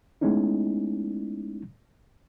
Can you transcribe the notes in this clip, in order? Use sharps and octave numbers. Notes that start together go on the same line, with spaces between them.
G#3 A3 B3 C#4 D#4 E4